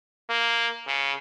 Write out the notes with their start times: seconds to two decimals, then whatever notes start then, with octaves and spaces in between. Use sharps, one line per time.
0.29 A#3
0.87 C#3